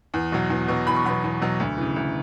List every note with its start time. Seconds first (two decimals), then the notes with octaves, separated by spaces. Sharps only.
0.14 E2
0.32 B2 F#3
0.50 E2
0.68 B2 F#3
0.87 E2 B5
0.96 C#6
1.05 B2 F#3 B5
1.24 E2
1.42 B2 F#3
1.60 D2
1.77 C#3 E3
1.96 D2